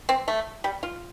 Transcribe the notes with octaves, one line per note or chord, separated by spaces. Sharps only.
C4
A3
G3
F4